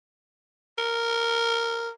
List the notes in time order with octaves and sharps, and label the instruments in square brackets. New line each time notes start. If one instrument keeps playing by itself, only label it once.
[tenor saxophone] A#4